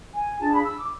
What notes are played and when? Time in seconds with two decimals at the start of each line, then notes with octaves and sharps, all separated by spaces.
0.13 G#5
0.40 D4 F4 G#4 A5
0.53 B5
0.66 E6
0.78 D6